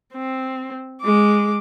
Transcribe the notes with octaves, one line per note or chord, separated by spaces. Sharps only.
C4
G#3 D6